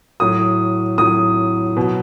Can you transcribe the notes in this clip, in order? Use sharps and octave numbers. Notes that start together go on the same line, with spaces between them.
A2 F#3 D#6
A2 F#3 D#6
B2 F#3